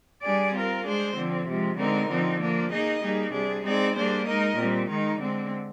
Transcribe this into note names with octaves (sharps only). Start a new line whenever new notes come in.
G3 D4 G#4 D5
C4 F4 A#4
G#3 D4 G#4 C5
D3 F3 C4
C3 F3 G#3
D3 G#3 C4 D#4 A#4
D3 F3 C4 D#4
F3 A#3 D4
A#3 D#4 G#4 D#5
G3 A#3 D#4 G#4
C3 G3 D4 G#4
G#3 C4 D#4 G#4 D5
G3 A#3 D4 G#4 C5
G#3 D#4 A#4 D#5
A#2 G3 C4
D#3 G#3 D#4
D3 G#3 C4